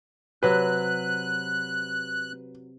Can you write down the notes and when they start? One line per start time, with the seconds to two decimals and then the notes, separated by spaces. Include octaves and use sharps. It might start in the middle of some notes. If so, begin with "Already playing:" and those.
0.43 C3 F#3 B4 F#6